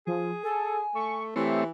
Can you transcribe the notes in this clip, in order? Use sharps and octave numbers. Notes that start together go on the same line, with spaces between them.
F3 G#4
A4 G#5
A3 C#6
E3 A3 C4 G4 C#5 E5